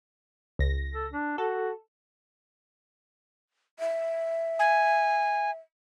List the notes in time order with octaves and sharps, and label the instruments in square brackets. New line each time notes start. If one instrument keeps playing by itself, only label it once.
[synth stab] C#2 A#6
[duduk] A4
D4
[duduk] F#4 [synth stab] A4
[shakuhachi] E5
[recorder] G#5